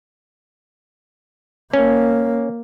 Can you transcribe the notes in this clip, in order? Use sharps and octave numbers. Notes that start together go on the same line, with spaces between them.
A#3 C#4